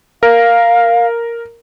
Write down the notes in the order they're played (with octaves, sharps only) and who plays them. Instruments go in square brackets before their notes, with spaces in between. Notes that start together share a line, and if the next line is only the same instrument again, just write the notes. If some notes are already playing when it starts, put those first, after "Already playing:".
[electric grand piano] A#4 [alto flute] F5